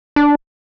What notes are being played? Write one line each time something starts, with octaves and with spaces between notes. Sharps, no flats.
D4